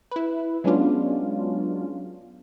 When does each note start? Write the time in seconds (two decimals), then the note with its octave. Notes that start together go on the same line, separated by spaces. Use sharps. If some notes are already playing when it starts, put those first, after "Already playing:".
0.11 E4 B4
0.64 F#3 G#3 B3 C#4 D4 F4